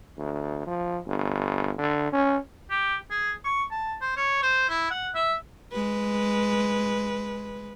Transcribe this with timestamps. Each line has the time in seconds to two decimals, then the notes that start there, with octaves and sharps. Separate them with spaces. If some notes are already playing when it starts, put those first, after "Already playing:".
0.18 D2
0.67 F3
1.07 G1
1.78 D3
2.13 C#4
2.70 G4
3.10 G#4
3.45 C#6
3.71 A5
4.01 C5
4.17 C#5
4.43 C5
4.69 E4
4.91 F#5
5.15 E5
5.72 G#3 B4